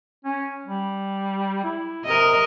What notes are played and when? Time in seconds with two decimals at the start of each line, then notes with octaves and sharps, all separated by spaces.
0.24 C#4
0.66 G3
1.64 E4
2.05 C3 A#4 D#5